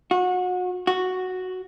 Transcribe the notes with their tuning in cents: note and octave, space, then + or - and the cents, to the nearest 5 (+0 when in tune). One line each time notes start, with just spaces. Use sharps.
F#4 -30
F#4 +0